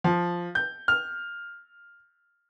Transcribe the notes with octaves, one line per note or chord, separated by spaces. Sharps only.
F3
G6
F6